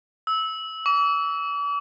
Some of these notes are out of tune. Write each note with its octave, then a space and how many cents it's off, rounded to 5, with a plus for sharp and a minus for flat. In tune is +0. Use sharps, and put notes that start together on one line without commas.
E6 -20
D6 -45